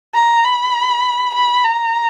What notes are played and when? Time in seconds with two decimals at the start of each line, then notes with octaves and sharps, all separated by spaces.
0.14 A#5
0.45 B5
1.34 B5
1.64 A#5